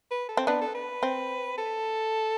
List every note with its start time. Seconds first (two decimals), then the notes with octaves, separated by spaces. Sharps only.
0.11 B4
0.29 A4
0.37 C4
0.47 B3 D4 B4
0.61 A4
0.75 B4
1.03 C4
1.58 A4